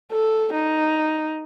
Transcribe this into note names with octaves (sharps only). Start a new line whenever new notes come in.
A4
D#4